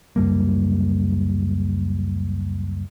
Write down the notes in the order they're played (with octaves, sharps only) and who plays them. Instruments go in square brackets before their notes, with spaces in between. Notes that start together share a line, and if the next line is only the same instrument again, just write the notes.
[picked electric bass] C#2 F#2 G3 A#3